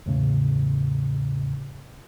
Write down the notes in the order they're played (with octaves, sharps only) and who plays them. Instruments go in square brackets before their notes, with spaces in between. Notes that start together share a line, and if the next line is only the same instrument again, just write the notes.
[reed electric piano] E2 A2 C#3